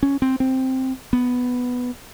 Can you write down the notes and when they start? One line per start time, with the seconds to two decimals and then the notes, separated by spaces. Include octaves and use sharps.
0.03 C#4
0.22 C4
0.40 C4
1.13 B3